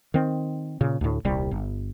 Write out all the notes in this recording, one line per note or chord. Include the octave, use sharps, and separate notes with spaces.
D#3 C4
A#2 C#3
D2 A2
D#1 C2 G3
G1